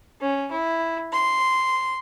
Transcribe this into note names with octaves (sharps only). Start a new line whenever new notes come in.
C#4
E4
C6